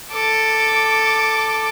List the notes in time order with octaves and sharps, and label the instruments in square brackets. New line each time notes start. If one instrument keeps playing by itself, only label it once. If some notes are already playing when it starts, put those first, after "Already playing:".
[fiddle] A4 D6